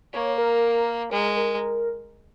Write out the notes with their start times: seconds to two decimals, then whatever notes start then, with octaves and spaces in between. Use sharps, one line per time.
0.13 A#3 C#5
0.38 A#4
1.11 G#3 A#4
1.37 A#4